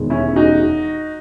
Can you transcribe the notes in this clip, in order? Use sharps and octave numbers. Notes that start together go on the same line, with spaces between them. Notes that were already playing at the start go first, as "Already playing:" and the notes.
Already playing: E1 D#2 D#3 G#3 B3
C#4 E4
D#4 F#4